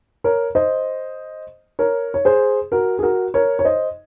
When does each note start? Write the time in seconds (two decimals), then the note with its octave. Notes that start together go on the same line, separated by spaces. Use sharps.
0.24 A#4 C#5
0.55 C5 D#5
1.79 A#4 C#5
2.14 C#5
2.25 G#4 C5
2.72 F#4 A#4
2.99 G#4
3.03 F#4 A#4
3.34 A#4 C#5
3.59 C#5
3.64 C5 D#5